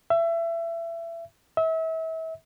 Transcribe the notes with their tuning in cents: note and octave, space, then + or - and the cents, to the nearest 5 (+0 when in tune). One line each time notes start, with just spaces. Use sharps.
E5 +25
E5 -35